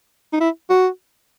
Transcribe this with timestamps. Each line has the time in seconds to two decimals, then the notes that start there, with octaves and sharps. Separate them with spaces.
0.33 D#4
0.40 E4
0.70 F#4